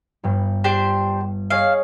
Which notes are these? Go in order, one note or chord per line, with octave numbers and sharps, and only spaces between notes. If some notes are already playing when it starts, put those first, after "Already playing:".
G1 G2
D4 G4 C5
G#4 C#5 D#5 F5